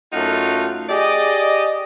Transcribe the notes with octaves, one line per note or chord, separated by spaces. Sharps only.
F#2 A3 D#4 F4 F#5
G4 G#4 D5 D#5